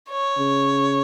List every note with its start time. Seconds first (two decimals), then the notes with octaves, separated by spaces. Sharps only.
0.10 C#5
0.38 C#3